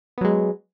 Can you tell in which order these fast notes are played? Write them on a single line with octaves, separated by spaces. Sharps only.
B3 F#3 G#3